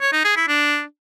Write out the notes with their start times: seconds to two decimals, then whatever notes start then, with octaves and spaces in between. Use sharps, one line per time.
0.01 C#5
0.13 D#4
0.24 G#4
0.36 E4
0.48 D4